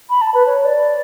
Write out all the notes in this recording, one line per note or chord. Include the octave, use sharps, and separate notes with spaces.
B5
A5
B4
C#5
D5